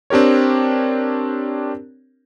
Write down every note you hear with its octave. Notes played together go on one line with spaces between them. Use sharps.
C4 D4 G4 A#4 C#5